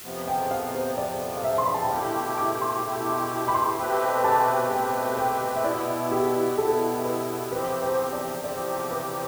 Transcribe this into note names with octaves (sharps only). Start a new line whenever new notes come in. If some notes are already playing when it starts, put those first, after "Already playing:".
F2 C3 F3 B3
G5
F5
C5
F2 C3 F3 B3 D5
F5
E5
C6
B5
A5
G5
B2 A3 E4 G4 F5
G5
D6
C6
B2 A3 E4 G4
D6
B5
C6
B2 A3 C4 G4 B4 B5
A5
B2 A3 C4 G4 B4 G5
G5
E5
B2 B3 E4 D5
G4
B2 B3 E4 A4
B4
E2 C3 F3 C4 G4 B4
C5
D5
E2 C3 F3 C4 G4 D5
B4